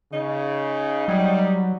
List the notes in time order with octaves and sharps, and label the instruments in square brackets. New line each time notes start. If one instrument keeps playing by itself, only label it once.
[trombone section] C#3 [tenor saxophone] D#4
[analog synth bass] F#3 [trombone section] G3